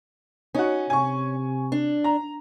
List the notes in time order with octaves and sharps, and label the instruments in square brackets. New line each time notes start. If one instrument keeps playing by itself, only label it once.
[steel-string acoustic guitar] C#4 [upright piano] D#4 F#4
[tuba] C3 [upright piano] G#5 C#6
[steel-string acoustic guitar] D4
[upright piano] A#5